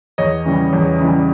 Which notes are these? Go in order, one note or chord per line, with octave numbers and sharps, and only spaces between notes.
E2 C#5 D#5
C#3 E3 G3
E2
C#3 E3 G3